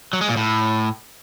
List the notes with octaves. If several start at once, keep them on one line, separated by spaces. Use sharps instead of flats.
F#3
G#3
A#2
A2